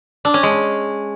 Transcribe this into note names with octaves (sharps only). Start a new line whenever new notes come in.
D4
C#4
G#3